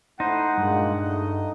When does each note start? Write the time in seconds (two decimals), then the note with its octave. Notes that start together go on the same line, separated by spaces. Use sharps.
0.20 A3 D#4 E4 C5 F#5
0.57 G2 A#2 G#3 A#3
1.01 A3 D#5